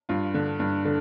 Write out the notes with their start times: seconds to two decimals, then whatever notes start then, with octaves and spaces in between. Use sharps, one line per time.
0.09 G2 F4
0.34 D3
0.60 G2
0.85 D3